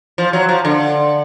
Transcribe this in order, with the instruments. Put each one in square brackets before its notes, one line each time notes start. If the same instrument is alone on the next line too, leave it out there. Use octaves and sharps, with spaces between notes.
[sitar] F3
F#3
F3
D3